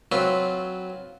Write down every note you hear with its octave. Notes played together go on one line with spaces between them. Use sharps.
F#3 C4 F4 B4 C#5